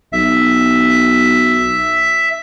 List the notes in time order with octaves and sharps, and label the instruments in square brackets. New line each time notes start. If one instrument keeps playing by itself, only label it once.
[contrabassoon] B1 [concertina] E5